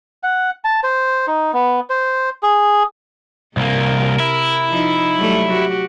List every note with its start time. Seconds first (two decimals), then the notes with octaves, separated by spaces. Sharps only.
0.23 F#5
0.64 A5
0.83 C5
1.27 D#4
1.53 B3
1.90 C5
2.43 G#4
3.57 C2 C3 A#3 A#4
4.20 E4
4.70 F3 D#4
5.16 F#3 G3 A3
5.52 F#4 G4